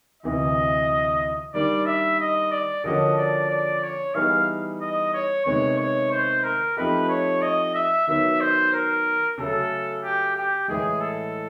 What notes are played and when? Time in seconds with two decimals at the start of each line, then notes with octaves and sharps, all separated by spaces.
0.23 D2 C3 E3 D#5
1.54 D#3 G3 A#3 D4 D5
1.86 E5
2.20 D#5
2.51 D5
2.84 D3 F3 A#3 C#4 F#4 D#5
3.17 D5
3.50 D5
3.83 C#5
4.15 E3 G3 B3 D#4 G#4 F5
4.81 D#5
5.14 C#5
5.46 C3 D#3 G#3 B3 C#5
5.78 C#5
6.12 C5
6.43 A#4
6.77 F3 A3 C4 D#4 G4 B4
7.09 C#5
7.42 D#5
7.75 E5
8.07 D#3 F#3 B3 E5
8.40 C5
8.73 A#4
9.38 C#3 F#3 A3 A4
10.03 G4
10.35 G4
10.68 A2 E3 G#3 G#4
11.01 A4